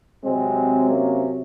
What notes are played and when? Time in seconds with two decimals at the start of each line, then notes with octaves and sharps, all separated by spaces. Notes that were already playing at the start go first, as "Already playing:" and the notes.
0.24 C3 F#3 G#3 C4
0.90 A#3 C#4